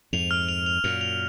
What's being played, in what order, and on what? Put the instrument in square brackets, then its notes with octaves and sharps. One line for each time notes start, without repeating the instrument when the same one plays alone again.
[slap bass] F2 G#2 [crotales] F7
[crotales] F6
F7
F7
[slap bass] F#2 A#2 [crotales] F7
[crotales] F7